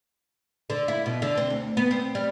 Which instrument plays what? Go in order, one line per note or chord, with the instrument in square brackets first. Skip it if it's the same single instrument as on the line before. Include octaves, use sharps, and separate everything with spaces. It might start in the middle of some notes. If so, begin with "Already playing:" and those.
[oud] D3
E4
B2
D3
C4
D2
B3
C4
G3